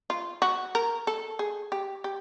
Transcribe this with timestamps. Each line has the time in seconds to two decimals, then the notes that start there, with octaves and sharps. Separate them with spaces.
0.10 F4
0.42 F#4
0.75 A#4
1.07 A4
1.39 G#4
1.72 G4
2.04 G4